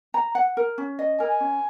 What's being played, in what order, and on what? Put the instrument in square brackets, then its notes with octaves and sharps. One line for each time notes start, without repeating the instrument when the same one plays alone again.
[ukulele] A#5
F#5
A#4
C#4
D#5
[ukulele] A#4 [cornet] G#5
[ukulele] C#4